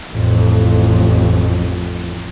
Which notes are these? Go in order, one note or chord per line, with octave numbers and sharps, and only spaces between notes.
A1 F2